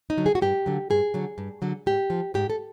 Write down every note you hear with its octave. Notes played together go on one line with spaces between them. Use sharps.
D#4
D3 F#3
G#4
F#4
G2 G4
D3 F#3
G2 G#4
D3 F#3
G2
D3 F#3
G#2 G4
F3
G#2 G4
A4